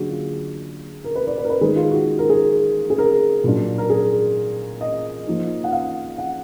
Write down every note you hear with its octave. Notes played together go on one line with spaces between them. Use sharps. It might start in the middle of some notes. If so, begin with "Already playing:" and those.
Already playing: D3 F#3 A#3 D4 F#4 G#4
F4
A#4
B4
D5
B4
A#4
B4
D#3 G#3 D#4 G#4
F4
F#4
A#4
G#4
G#4
A#4
A#2 F#3 D4
A#4
G#4
D#5
F3 A#3 D#4
F#5
F5
F#5